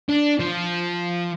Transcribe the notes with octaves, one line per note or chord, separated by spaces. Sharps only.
D4
F3